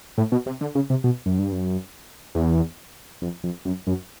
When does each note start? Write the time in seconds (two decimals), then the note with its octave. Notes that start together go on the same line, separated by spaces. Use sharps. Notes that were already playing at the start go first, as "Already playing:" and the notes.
0.18 A2
0.32 B2
0.46 C3
0.61 D3
0.75 C#3
0.90 C3
1.04 B2
1.26 F#2
1.39 G2
1.52 F#2
2.35 E2
3.22 F2
3.44 F2
3.65 F#2
3.87 F#2